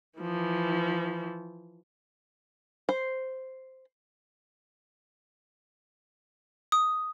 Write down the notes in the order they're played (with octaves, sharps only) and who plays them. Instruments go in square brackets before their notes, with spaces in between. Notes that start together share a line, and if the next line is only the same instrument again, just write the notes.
[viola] E3 F3
[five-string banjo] C5
[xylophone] D#6